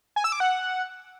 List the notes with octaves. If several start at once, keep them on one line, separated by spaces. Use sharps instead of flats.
G#5
E6
D6
F#5